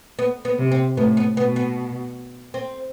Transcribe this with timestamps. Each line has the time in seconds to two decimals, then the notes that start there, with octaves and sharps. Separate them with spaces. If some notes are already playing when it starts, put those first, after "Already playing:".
0.19 B3
0.45 B3
0.59 C3
0.71 C4
0.97 A2 B3
1.17 B3
1.37 B2 B3
1.56 B3
2.54 C4